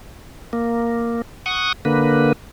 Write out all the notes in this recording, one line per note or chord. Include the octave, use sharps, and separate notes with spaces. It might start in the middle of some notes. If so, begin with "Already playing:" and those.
A#3
F#5 C#6 D#6
D3 A#3 B4